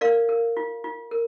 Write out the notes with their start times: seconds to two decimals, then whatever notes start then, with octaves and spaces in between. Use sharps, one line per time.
0.01 A#4 D5 F5
0.29 A#4
0.57 F4
0.84 F4
1.11 A#4